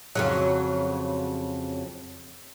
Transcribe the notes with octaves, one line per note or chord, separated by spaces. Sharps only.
F2 C#3 F#3